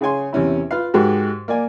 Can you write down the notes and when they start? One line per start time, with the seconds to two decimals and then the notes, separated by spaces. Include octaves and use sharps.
0.01 C#3 G#4 C#5 G#5 C6
0.33 E2 C3 C#4 E4
0.71 F4 B4 F5
0.94 G#2 G#3 F#4 G4 A#4
1.48 A#3 D5 G#5